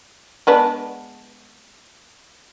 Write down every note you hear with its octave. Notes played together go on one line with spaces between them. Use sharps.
G#3 B3 D4